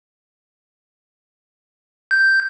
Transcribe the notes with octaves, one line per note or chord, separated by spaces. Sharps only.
G6